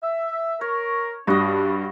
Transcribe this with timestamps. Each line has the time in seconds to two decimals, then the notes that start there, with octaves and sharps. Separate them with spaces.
0.02 E5
0.61 A#4 C#5
1.27 G2 D4 F#4 D#5